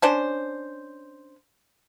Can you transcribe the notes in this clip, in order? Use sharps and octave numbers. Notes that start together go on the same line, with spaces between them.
C#4 D4 C5